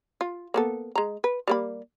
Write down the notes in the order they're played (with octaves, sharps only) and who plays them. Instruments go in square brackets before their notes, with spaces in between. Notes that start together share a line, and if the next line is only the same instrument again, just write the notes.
[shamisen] F4
A#3 B3 A4
G#3 A#5
B4
G3 A#3 B5